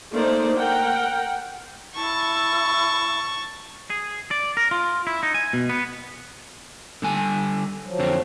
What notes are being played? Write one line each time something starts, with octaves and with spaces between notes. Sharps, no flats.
A3 A#3 D4 D#4 C5 D5
A#4 F#5 G5
E4 A5 C#6
G#4
D5
A#4
F4
E4
D#4
G#5
B2
B3
D3 G3 G#5
F3 F#3
F2 D3 C4